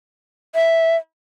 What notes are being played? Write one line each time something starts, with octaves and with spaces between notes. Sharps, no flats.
E5